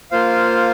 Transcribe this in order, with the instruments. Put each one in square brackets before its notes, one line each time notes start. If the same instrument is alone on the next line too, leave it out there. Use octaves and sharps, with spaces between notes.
[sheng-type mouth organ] A#3 F4 C5 F5